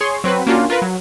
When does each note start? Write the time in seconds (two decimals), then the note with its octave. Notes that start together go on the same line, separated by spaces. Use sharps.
0.01 G#4 C#5 C6 C#6
0.24 F#3 C4 F#4 B4
0.47 A#3 C#4 D4 F4 F#4
0.70 F4 A#4 B4
0.82 F#3